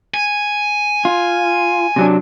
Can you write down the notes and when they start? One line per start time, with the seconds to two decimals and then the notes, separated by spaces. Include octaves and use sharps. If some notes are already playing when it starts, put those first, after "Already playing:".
0.14 G#5
1.05 F4
1.96 C3 F#3 D4